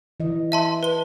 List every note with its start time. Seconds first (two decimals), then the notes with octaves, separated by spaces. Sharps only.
0.20 E3 D#5
0.52 E5 A5 C6
0.83 B4 G7